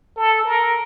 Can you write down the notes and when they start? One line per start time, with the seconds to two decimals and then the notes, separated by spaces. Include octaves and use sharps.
0.17 A4
0.45 A#4